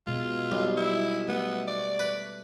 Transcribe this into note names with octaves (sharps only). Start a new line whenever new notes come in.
B2 G#3 F4
B1 G3
E4
A3 B3
D5
B4